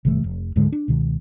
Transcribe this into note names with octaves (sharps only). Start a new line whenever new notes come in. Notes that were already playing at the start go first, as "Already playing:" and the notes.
G1 C3 E3 A3
F1
D1 G#2 D3 G#3
D4
C#2 B2 D#3